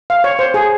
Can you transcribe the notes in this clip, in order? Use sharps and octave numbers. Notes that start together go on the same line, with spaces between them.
F5
C#5
C5
G#4